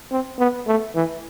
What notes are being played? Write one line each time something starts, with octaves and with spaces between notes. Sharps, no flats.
C4
B3
A3
E3